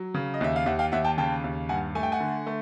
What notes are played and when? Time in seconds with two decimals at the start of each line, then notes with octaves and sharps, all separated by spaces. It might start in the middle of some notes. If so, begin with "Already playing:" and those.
Already playing: F#3
0.14 C#3
0.34 D#5
0.41 D#2 E5
0.56 F5
0.66 D#2 E5 F#5
0.79 F5 G5
0.92 D#2 E5 F#5
1.05 G5 A5
1.18 C#3 G5 A5
1.44 D#2
1.69 G2 F#5 G#5
1.95 A3 G#5
2.03 G5
2.12 F#5 G#5
2.20 D3
2.47 A3